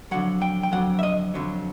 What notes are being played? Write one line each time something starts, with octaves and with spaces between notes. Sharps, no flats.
F2 D3 F#3 F#5
G5
G5
F2 D3 F#3 F#5
E5
D#5
F2 D3 F#3